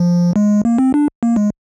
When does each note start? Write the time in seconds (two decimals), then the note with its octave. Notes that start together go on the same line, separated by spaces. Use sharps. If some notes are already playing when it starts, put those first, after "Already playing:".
Already playing: F3
0.36 G#3
0.65 A#3
0.78 C4
0.94 D4
1.23 A#3
1.36 G#3